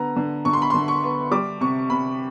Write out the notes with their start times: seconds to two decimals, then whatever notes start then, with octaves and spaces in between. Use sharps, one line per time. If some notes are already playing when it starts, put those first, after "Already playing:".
Already playing: D3 B3 A#5
0.16 D3
0.45 D3 C#6
0.53 C6
0.62 B5
0.70 D3 C6
0.88 C#6
1.03 B3
1.31 G3 D6
1.61 C3 C#6
1.90 C3 B5